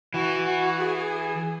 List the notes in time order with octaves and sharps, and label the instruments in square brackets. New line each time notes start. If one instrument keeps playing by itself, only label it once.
[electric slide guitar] E3 [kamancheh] F#4
[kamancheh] F#4
G#4